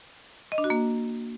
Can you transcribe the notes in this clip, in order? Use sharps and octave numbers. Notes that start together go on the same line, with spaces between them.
D#5
D4
F#4
A#3